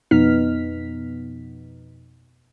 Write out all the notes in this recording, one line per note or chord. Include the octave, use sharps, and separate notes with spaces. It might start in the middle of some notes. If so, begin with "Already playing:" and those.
F2 B2 B3 D#4 F6 B6